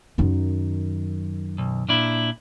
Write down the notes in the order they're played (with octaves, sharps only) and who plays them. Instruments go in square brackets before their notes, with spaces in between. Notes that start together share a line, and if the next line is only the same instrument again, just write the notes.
[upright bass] F#2 D#3
[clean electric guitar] B1
A#2 D4 E4